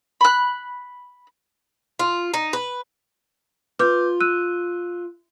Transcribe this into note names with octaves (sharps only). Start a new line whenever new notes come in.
B5 F#6
F4
D#4
B4
F4 B4 D6 G6
E6 F#6 D#7